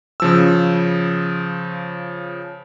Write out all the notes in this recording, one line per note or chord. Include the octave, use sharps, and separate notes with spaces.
C#3 F3 E6